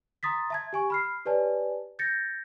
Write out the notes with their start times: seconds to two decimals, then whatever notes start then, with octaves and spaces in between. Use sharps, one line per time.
0.23 A#5 C6 D#6 A6 B6
0.50 E5 A5 G#6
0.73 G4 G#5 C#6
0.90 B5 F6 C7
1.26 G4 B4 C#5 D5 G#5 A5
1.99 G6 A6 A#6 C#7